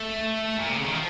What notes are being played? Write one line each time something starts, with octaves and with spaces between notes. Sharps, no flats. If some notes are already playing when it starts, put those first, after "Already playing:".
Already playing: A3
A#2
C3
C#3
D#3
F3